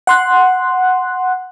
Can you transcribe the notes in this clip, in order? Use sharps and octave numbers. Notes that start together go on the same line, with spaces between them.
F#5 C6 F#6